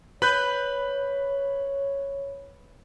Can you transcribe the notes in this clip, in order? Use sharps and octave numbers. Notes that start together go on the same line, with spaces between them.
B4 C#5 B5 F#6 G6